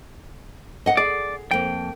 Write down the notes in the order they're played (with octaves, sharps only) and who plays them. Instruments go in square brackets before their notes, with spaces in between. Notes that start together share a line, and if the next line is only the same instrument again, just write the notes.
[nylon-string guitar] D#5 F#5
[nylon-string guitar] G#4 [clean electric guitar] D5
[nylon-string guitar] F2 A#3 [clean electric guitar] G5